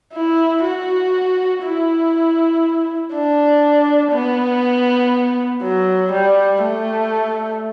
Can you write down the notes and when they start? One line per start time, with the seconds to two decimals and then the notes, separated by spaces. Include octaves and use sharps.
0.14 E4
0.64 F#4
1.63 E4
3.13 D4
4.12 B3
5.62 F#3
6.12 G3
6.62 A3